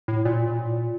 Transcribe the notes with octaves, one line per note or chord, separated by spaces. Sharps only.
A2
A#2